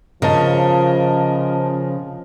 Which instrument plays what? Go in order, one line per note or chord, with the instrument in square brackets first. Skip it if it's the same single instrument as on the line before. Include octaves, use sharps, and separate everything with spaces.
[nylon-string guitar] C#3 [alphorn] F3 [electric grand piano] A#4 D#5 A5